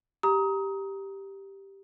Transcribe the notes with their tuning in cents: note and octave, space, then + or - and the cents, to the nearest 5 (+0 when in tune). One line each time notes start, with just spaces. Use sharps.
G4 +0 A#5 +10 D#6 +25